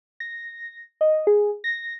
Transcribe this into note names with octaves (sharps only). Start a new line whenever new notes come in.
A#6
D#5
G#4
A#6